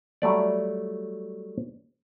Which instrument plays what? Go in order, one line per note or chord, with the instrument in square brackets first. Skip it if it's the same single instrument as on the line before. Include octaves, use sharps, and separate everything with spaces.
[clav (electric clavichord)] F#3 G3 A3 D5